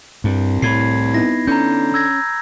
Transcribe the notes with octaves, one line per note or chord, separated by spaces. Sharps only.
C2 G2
A2 B5 G#6 C7
B3 D#4 E4 A#6
D3 C#4 A#5 G6
E6 G#6 A#6